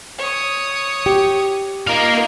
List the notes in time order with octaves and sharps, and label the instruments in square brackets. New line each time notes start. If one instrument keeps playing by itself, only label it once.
[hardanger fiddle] C#5 D#6
[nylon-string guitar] G4
[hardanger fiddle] D#4 F4 [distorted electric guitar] A#4 F5